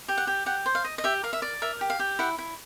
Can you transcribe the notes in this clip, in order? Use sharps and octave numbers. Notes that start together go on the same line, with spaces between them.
G4
F#5
G4
G4 F#5
C5
F5
D#5
D#5
G4 E5
A#4 F5
E5
D5
A#4 E5
G4
F5
G4
E4 F#5
E4